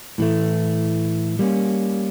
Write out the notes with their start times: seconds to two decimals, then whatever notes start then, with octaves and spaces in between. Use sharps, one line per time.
0.18 A2 E3 A3
1.39 G3 A#3 C#4